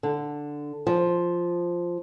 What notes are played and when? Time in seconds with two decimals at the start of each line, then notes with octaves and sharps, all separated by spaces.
0.03 D3
0.87 F3